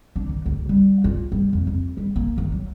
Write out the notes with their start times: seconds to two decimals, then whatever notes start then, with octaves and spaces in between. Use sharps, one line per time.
0.16 D4
0.29 D#3
0.46 D2
0.69 G3
1.04 F4
1.32 G3
1.53 F2
1.67 F2
1.97 G3
2.16 A#3
2.38 D#3
2.52 F#3